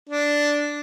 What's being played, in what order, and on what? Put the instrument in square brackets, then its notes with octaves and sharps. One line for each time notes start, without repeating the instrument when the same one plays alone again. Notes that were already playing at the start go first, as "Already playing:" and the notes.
[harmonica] D4